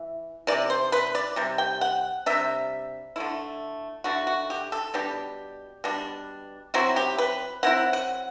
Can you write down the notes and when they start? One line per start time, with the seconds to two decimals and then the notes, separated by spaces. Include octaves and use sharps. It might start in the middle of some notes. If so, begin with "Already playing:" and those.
Already playing: E3
0.47 C3 E3 D5
0.70 C5
0.92 B4
1.15 D5
1.36 C3 G3
1.58 G5
1.81 F#5
2.26 C3 G3 D4 E5
3.16 D3 A3 E4
4.04 D3 A3 E4 F#4
4.27 F#4
4.50 G4
4.72 A4
4.94 B2 G3 D4 G4
5.84 B2 G3 D4
6.74 F#3 C4 E4 F#4
6.96 G4
7.18 B4
7.63 F#3 C4 E4 F#5
7.93 F#5